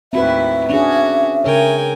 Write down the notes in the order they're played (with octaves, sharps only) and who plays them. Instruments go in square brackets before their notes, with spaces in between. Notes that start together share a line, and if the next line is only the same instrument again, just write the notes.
[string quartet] D#2 A2 E4 [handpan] C4 F#4 B4 [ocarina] E5
[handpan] C#4 D4 G#4 [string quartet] F#4
[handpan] C#3 G#4 C#5 [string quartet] A#4 G5 G#5